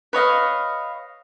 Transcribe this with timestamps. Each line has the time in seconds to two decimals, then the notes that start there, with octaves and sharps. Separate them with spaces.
0.13 B4 C#5 D#5 F5